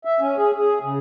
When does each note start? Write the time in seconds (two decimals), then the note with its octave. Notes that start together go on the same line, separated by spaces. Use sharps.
0.05 E5
0.20 C#4
0.38 G#4
0.58 G#4
0.83 C#3